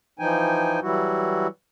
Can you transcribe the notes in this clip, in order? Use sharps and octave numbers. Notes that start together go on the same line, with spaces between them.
E3 F3 D#4 G5 G#5
E3 F#3 G3 E4 F#4